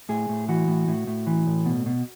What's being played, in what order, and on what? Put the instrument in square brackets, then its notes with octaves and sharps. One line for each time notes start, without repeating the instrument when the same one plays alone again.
[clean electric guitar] A2 G#4
A2
E3 F#4
A2
A2
A2
E3
A2
B2
B2